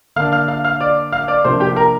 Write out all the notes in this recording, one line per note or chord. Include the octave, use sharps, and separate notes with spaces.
D3 A#3 D4 F5 F6
F5 F6
F5 F6
F5 F6
D5 D6
F5 F6
D5 D6
C3 F3 A#3 D4 C5 C6
G4 G5
A#4 A#5